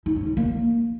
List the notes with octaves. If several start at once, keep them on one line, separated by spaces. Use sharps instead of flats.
D#4
C#4
G3
A#3